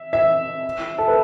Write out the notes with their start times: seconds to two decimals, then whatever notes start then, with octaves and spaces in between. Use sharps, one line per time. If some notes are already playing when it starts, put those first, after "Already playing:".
Already playing: E5
0.13 E5
0.98 A4
1.08 B4